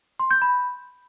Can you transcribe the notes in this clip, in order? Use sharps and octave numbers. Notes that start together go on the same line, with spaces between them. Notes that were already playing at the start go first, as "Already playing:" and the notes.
C6
G6
B5